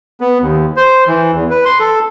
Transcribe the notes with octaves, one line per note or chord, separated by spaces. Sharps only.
B3
D#2
C5
E3
E2
B4
C6
A4